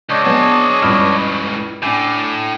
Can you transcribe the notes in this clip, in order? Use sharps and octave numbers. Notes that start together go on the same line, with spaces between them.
C#2 D4 C#5 D#5
B2 F#3 B3 G#4 A5
C#2 G2 G#3 E4 F6
A2 D4 G#5 D6